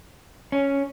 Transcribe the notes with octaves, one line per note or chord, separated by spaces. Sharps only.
C#4